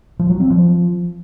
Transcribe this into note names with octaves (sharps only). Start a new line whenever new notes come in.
F3
F#3
C4
F3